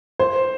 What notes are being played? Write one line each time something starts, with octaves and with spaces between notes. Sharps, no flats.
C5